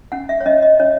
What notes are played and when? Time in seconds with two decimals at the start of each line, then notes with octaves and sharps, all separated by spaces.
0.12 C#4 F#5
0.29 E5
0.40 C#5
0.46 C#4 D#5
0.62 D#5
0.80 C#4 C#5